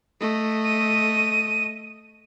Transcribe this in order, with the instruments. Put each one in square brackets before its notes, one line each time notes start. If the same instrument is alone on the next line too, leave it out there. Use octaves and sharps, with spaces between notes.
[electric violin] A3 D#5
[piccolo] D#7